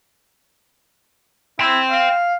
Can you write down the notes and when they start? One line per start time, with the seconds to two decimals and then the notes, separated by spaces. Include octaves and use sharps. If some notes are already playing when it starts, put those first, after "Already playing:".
1.60 E4 G5 C6
1.90 F5